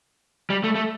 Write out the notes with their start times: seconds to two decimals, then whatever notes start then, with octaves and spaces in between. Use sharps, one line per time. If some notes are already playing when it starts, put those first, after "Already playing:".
0.50 G3
0.64 A3
0.75 A3